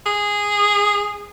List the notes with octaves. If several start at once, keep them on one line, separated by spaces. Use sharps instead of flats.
G#4